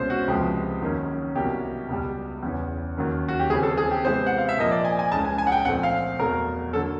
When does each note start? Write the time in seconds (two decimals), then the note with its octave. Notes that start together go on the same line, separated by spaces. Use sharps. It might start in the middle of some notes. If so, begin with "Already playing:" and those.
Already playing: C2 B2 G#3 C#4 C5
0.10 F#4
0.28 C#2 C3 F3 G#3 B3 G4
0.81 F#2 D#3 F#3 A#3 C#4
1.35 C2 B2 F#3 A#3 G4
1.89 C#2 B2 G3
2.43 E2 C#3 E3
2.97 D#2 D#3 F#3 A#3 C#4
3.28 F#4
3.39 G4
3.50 D#2 C#3 E3 G3 C4 G#4
3.63 A4
3.77 G#4
3.91 G4
4.04 C3 E3 G#3 B3 C5
4.27 F#5
4.38 F5
4.49 E5
4.57 A#2 F3 A#3 D#5
4.71 D5
4.85 G#5
4.99 G#5
5.11 C#2 C#3 E3 G#3 C#4 A5
5.25 G#5
5.38 G#5
5.47 F#5
5.52 G5
5.65 A#2 F3 A3 C4 F#5
5.83 F5
6.19 E2 B2 F#3 A3 A#4
6.73 D3 F#3 A#3 A4